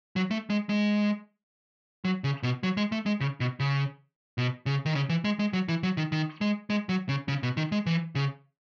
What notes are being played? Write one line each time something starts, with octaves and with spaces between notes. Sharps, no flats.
F#3
A3
G#3
G#3
F#3
C#3
B2
F#3
G#3
A3
G#3
C#3
B2
C#3
B2
C#3
D#3
C#3
E3
G#3
G#3
F#3
E3
F#3
D#3
D#3
G#3
G#3
F#3
C#3
C#3
B2
D#3
G#3
E3
C#3